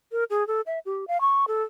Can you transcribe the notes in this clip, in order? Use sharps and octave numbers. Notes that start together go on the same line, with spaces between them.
A#4
G#4
A4
E5
G4
F5
C#6
A4